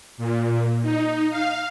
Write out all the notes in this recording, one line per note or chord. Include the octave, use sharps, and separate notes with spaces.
A#2
D#4
F5